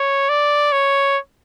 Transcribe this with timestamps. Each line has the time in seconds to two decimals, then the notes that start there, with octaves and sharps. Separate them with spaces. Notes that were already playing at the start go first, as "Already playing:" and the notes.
Already playing: C#5
0.29 D5
0.72 C#5